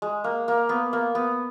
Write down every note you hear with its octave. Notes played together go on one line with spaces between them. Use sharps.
G#3
A#3
A#3
B3
A#3
B3